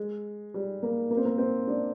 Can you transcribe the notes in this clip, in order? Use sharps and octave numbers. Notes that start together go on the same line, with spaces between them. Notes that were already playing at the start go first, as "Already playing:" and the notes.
Already playing: G#3
G3
A#3
A#3
C4
A#3
C4
D4